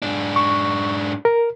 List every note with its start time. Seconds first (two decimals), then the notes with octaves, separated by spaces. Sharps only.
0.02 G#2 D4
0.36 C#6
1.25 A#4